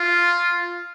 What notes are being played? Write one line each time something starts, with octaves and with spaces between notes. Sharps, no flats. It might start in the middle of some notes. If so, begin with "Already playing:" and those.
Already playing: F4